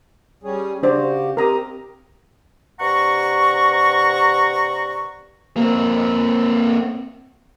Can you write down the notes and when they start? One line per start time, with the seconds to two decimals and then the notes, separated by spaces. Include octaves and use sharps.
0.43 G3 C#4 G#4
0.83 C#3 D4 F#4 G4 C5 D5
1.37 C4 G4 A#4 A#5 D#6
2.80 G2 C3 F#5 A#5 C#6
5.57 A#3 C4